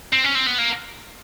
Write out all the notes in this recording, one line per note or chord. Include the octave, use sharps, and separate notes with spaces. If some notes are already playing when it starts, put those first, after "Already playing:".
C4
C#4
C4
B3
A#3